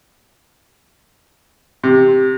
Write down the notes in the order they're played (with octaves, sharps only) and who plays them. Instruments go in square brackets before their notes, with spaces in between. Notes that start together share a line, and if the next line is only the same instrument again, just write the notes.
[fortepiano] C3